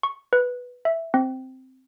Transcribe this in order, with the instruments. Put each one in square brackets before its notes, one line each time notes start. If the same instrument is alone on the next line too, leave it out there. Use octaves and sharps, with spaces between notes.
[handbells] C#6
B4
E5
C4